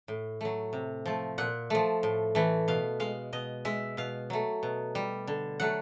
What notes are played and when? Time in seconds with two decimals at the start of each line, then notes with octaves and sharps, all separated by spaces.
0.08 A2
0.41 F#3 A3
0.73 C3
1.06 F3 A3
1.38 A#2 F#5
1.70 F3 A3
2.03 A2
2.35 E3 A3
2.68 B2 F5
3.00 G#3 F5
3.33 B2 D#5
3.65 G#3 E5
3.97 B2 F5
4.30 F#3 A3
4.63 B2
4.95 G3
5.27 D3
5.60 F#3 A3 F#5